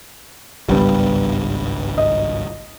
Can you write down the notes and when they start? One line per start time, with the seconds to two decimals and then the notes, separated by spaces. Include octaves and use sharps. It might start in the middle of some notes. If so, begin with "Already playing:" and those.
0.69 G#1 C#2 G2 G3 B3
1.98 D#5